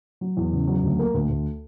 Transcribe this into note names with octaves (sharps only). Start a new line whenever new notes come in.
F#3
E2
C#3
F#3
D2
A#3
D2
D2